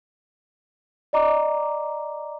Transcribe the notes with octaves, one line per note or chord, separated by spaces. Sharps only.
D5 D#5 A#5 D6